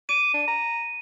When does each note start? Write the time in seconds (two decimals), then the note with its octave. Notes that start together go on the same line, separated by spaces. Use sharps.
0.09 D6 D#7
0.34 D4
0.47 A#5